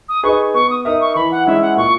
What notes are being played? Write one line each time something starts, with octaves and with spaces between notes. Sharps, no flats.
D#6
D#4 G#4 B4 C#6
B3 C#6
D#6
D#4 A#4 E5 D#6
C#6
E3 B5
F#5
G#3 C#4 E4 E5
F#5
A#2 C#6